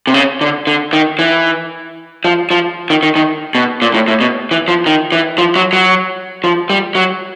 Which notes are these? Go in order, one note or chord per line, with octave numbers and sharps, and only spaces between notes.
C3
C#3
D3
D3
D#3
E3
F3
F3
D#3
D#3
D#3
B2
A#2
A2
A2
B2
E3
F3
D#3
E3
F3
F#3
F#3
F3
G3
F#3